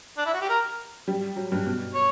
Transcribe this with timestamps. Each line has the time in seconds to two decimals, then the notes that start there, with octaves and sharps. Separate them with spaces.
0.18 D4
0.26 E4
0.34 F#4
0.41 G4
0.49 A#4
1.08 G3
1.36 F#3
1.52 G2
1.67 B2
1.94 C#5